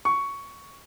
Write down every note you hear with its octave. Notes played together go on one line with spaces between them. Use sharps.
C#6